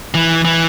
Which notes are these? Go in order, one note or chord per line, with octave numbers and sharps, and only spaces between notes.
E3
E3